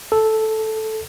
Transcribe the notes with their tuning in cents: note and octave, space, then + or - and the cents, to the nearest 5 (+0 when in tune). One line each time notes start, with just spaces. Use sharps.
A4 -5